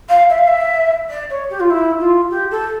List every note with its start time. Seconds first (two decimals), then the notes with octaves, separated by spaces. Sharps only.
0.09 F5
0.29 E5
0.38 F5
0.47 E5
1.09 D5
1.30 C#5
1.50 G4
1.60 F4
1.70 E4
1.99 F4
2.30 G4
2.51 A4